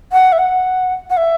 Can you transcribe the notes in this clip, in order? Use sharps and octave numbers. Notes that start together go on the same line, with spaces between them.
F#5
E5
F#5
F#5
E5